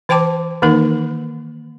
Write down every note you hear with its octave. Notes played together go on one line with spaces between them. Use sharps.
E3 C5 G5 A5 D6
D#3 E3 A#3 D#4 A#4